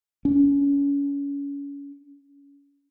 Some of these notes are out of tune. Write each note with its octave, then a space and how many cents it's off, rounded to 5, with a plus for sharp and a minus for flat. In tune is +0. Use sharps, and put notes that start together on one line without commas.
C#4 +30